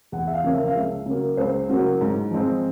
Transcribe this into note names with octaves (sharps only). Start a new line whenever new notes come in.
E2 F#5
E5
F5
C#3 F3 A#3 C#4
E5
F5
C#2 E5
C#3 F#3 A#3
C#2 C5
C#3 F#3 A#3
G#2
F3 G#3 C4